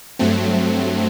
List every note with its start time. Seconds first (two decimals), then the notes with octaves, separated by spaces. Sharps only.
0.19 G2 F#3 A3 C4